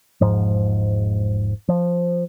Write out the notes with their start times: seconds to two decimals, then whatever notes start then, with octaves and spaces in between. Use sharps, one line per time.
0.21 E1 G#2 F3
1.68 F3